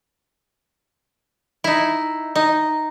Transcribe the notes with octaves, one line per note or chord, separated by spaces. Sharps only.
D#4 E4
D#4